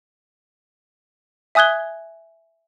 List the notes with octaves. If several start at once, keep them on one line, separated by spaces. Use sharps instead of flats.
E5 G#5 D#6 F#6 G#6 G7